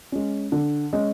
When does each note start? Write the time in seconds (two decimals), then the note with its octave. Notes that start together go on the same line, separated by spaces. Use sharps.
0.12 G#3 C#4
0.52 D3
0.93 G#3 C#4